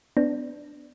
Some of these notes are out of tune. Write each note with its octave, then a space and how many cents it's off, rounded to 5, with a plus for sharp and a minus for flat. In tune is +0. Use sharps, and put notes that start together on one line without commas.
B3 +25 D4 +0